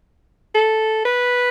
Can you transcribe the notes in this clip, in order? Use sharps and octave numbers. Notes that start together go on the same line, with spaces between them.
A4
B4